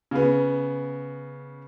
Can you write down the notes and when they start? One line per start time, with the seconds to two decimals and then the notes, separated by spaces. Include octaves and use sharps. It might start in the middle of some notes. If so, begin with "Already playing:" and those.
0.11 C#3 B3